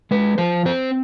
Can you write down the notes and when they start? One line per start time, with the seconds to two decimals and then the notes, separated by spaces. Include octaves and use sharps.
0.11 G#3 B4
0.38 F3 C5
0.66 C4 C5